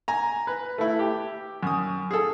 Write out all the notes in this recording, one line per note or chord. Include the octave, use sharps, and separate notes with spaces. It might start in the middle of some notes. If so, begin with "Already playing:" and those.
G#5 A#5
B4
A3 E4
G4
F#2 D#6
G#4 A4